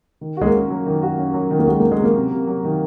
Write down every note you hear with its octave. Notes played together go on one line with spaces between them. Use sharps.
D#3
G#3 F#4
A#3
C#4
F#3
D#3
F#4
C#4
F#3
D#3
A#3
G#3 F#4
A#3 C#4
G#3
F#3 A#3
C3
C3
F#3
D#3